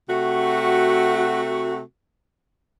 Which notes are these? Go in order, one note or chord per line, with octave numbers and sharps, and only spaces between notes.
C3 A3 F#4